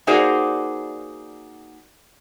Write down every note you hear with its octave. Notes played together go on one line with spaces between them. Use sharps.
A#3 D#4 F#4 G#4 C5 D5